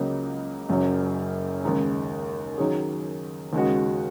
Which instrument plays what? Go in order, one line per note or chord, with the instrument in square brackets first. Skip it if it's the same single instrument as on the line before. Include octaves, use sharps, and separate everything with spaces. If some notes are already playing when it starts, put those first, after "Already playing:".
Already playing: [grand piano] C#2 C#3 F#3 A#3
F#1 F#2 F#3
D#2 C#3 G#3 D#4
D#3 F#3 C#4 G#4
D#2 C#3 G#3 F#4